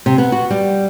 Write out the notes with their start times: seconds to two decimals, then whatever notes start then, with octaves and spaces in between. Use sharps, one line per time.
0.06 C3
0.18 B3
0.32 F#4
0.51 G3